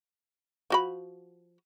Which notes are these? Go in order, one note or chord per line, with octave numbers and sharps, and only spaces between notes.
F3 F#4 B5